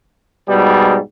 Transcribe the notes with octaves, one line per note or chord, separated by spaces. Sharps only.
G#2 B2 G3